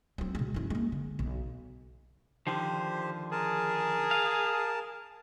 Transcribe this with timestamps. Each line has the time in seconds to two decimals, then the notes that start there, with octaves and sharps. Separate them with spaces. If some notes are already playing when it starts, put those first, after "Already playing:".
0.18 F#3 C4
0.35 B2 G#3
0.54 F#2 E4
0.70 G#3 A#3
0.92 D3
1.19 B1
2.47 D3 D#3 F3 G4 C5
3.32 G#4 A#4 A5
4.11 F5